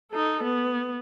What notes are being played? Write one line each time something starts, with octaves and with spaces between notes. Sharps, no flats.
D#4 A4
B3